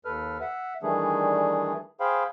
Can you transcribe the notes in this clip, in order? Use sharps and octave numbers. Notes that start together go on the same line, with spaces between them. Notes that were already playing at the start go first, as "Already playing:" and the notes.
D#2 A4 B4 F6
E5 F#5
D#3 E3 G3 A3 D4 G#4
G#4 C5 F5 G5 B5